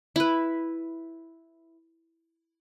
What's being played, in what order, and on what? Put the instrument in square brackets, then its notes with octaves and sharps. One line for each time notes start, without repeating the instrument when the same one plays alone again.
[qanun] E4 B4